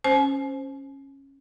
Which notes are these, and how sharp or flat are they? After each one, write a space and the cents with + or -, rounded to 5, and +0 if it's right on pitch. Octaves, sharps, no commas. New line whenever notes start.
C#4 -15 C5 +5 G#5 +40